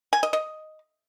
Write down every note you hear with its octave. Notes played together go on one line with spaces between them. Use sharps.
G#5
D#5
D#5